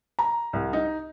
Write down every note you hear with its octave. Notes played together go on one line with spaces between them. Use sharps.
A#5
C2
D#4